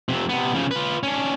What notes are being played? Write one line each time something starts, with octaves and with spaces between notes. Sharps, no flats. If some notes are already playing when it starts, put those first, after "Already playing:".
F2 C3
C3 B3
C#3 F3
F4 B4
C#4 D4